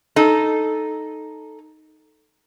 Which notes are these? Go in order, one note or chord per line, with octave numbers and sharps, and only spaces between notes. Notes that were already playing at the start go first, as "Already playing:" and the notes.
D#4 A4